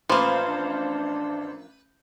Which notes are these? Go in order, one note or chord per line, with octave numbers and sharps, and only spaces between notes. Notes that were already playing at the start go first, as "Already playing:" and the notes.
A1 F3 A#3 B4 C5 F5
D4